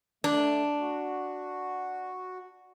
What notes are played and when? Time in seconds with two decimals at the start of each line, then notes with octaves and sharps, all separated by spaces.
0.24 A3 D4
0.79 F#4